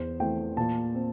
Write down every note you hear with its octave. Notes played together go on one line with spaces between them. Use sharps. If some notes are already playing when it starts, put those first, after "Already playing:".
Already playing: E2 C5
E3 A3 C4 G5
A#2 A5
C4